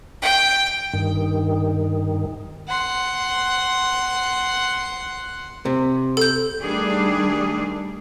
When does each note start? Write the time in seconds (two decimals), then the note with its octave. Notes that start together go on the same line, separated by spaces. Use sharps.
0.22 G5
0.93 G2 D#3
2.68 F#5 C6
5.65 C3
6.17 A4 G6
6.62 D#3 G3 A3 D4 G#4